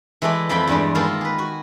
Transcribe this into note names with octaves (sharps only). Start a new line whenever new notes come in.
E3 G#3 A3 A4 D5
F2 F3 E4 G5 B5
E2 G2 G3 G#3
D#3 G#3 A#3 F4 A4
G#4 B4
F#4